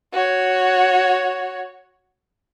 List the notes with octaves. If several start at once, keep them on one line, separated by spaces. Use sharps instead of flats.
F#4 C#5